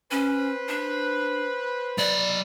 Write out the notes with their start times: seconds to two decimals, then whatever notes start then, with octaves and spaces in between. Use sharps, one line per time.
0.11 C#4 B4 C5
0.68 D4
1.98 F#3 D5 B5